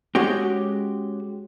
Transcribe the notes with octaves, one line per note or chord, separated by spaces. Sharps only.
G#3 C#4 F#4 G4